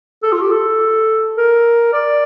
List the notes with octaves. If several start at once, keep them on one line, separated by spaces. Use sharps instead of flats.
A4
F4
G4
A4
A#4
D5